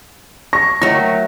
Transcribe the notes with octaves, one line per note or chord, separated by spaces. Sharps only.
C#6 A#6
D#3 F#3 A3 F#4 A#6